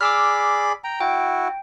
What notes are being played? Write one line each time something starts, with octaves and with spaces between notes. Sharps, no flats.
G#4 D5 B5 D6 E6 F6
G5 A#5
E4 F#4 G5